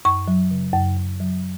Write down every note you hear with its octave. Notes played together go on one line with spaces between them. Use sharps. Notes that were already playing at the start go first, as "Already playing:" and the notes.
F#2 C#6
F#3
C#3
F#2
F#2
F#3